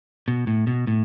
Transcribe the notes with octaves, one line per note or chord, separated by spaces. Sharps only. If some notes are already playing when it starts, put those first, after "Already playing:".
B2
A2
B2
A2